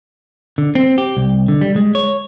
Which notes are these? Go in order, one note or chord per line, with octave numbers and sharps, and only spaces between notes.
D3
C4
G4
C2
D3
G3
G#3
C#5